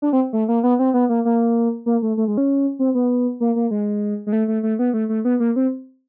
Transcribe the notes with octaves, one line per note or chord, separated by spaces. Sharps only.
D4
C4
A3
A#3
B3
C4
B3
A#3
A#3
A#3
A3
A3
G#3
C#4
C4
B3
A#3
A#3
G#3
G#3
A3
A3
A3
B3
A3
A3
B3
A#3
C4